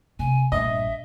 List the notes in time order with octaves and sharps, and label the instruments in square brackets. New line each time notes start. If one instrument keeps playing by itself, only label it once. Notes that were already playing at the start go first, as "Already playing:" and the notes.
[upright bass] C3 [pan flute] G#5
[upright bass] A#1 G2 [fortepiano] D#5 [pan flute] E5